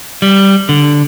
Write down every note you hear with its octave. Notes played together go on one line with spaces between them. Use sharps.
G3
D3